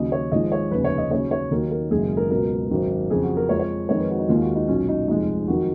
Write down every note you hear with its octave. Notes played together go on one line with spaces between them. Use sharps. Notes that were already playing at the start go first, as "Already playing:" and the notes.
Already playing: D#2 C#3 F#3 D#5
C#5
G#1 G#2 F3 G#3 D#5
C#5
F1 D#2 C#3 F3 B4
C#5
D#5
D#2 C#3 F#3 C#5
C#5
D#2 D#3 F#3 A#4
A#4
F#1 F#2 D#3 G#3 G#4
A#4
C#2 B2 F#3 A#4
G#1 F#2 D#3 F#3
F2 C#3 F#3 G#4
F#4
A#4
F2 F3 G#3 C#5
C#5
F2 D#3 G#3 C#5
B4
F#4
D#4
D#2 D#3 G#3 F4
F#4
D#4
B1 A#2 F#3 C#4
D#4
F1 F2 F3 G#3 D#4
F2 D#3 F#3 F#4